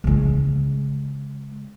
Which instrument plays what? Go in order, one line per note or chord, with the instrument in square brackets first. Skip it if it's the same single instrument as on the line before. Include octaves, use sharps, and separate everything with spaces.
[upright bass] C#3 G#3